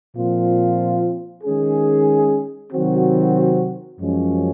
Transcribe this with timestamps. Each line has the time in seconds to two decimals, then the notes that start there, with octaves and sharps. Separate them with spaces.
0.16 A#2 F3 C4 F4
1.43 D#3 G#3 C#4 G#4
2.72 C3 D#3 F#3 C4 F#4
4.00 F#2 F3 G#3 C#4